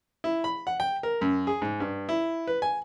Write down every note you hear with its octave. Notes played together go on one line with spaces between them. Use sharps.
E4
B5
F#5
G5
A#4
F#2
G#4
G#2
G2
E4
B4
G#5